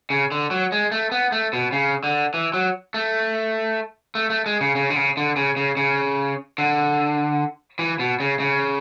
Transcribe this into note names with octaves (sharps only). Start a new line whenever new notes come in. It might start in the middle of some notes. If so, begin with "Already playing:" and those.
C#3
D3
F#3
G#3
A3
B3
A3
B2
C#3
D3
E3
F#3
A3
A3
A3
G#3
C#3
C#3
D3
C#3
D3
C#3
C#3
C#3
D3
E3
B2
C#3
C#3